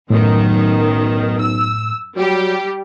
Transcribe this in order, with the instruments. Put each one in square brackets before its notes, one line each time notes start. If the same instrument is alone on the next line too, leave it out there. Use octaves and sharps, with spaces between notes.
[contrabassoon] B1 [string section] F#2 D#3 [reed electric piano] A2
[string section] E6
[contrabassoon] F#3 [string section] G3 G4